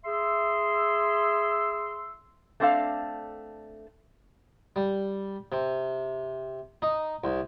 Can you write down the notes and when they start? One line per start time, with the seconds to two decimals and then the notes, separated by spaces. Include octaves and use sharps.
0.05 G#4 E5 C6 E6
2.60 A3 C4 D4 A4 F5
4.76 G3
5.52 C3
6.82 D#4
7.24 C2